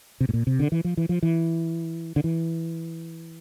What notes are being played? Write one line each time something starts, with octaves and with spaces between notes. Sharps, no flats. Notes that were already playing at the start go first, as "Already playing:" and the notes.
C3
A2
A#2
C3
D3
E3
F3
E3
F3
E3
D3
E3